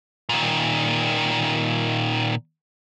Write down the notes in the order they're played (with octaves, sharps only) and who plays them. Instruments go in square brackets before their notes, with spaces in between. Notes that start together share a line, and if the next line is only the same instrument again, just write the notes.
[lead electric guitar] A#2 D#3